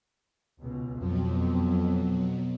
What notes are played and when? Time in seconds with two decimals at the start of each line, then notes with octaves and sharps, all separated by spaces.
0.61 C#2 B2
0.99 F2 B2 F#3